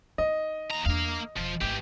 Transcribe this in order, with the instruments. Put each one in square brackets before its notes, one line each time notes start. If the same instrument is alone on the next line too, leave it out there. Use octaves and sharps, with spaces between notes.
[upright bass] D#4 [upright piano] D#5
[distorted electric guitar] D#2 A#5
[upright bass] E2 D4 [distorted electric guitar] A#3 F5
[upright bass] E1 [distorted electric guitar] F3
[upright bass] G#1 A3 [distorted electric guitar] E3 G4